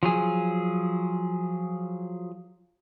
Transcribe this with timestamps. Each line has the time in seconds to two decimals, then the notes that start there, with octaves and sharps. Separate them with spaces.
0.03 F3 F#3 G#4